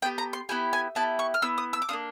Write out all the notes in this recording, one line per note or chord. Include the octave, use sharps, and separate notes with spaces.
B3 E4 G4 G5
A#5
C6
B3 E4 G4 G#5
G#5
B3 E4 G4 A5
C#6
F6
B3 E4 E6
D#6
E6
D6
A#3 D4 F4 D#6